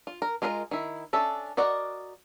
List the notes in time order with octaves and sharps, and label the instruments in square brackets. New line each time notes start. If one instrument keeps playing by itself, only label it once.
[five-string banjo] F4
A#4
G#3 F4 A#4 B4 D#5
D#3 E4
C#4 D4 A4 E5
F#4 A#4 D5 D#5 F#5